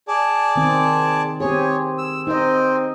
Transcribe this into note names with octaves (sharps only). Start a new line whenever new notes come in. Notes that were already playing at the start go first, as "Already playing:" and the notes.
G#4 D5 A5
D#3 C4
C4 G4 G#4 C#5
E6
C4 D#4 D#5